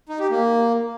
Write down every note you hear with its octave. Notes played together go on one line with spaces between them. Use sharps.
D#4
G4
A#3